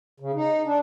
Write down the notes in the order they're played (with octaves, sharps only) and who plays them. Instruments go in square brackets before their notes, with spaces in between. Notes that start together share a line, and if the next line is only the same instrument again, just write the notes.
[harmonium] C#3
D#4
D4